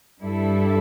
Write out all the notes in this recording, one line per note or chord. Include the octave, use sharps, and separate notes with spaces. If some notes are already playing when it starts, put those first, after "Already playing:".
G2 G3 E4 A4